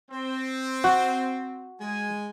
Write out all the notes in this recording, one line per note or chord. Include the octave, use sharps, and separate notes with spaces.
C4
F#4
G#3 G#5